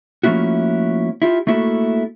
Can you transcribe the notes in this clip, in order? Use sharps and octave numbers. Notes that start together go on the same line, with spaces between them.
F3 A3 A#3 C#4 E4 F#4
E4 F4 G4
A3 A#3 E4 F#4 G#4 A4